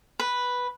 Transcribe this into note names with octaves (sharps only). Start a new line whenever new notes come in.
B4